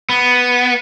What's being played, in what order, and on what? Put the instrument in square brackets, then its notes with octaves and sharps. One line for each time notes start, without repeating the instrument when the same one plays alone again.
[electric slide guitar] B3